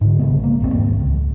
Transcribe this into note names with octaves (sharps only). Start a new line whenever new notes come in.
G#2 D3
A#1 C#3 G#3 B3
A#3
A#1 E2 C#3 C4
D#2 G#2
C#2